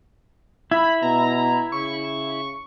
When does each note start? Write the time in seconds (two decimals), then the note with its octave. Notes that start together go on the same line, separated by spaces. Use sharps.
0.71 E4 B5
1.03 B2 A#5
1.72 C#3 C#6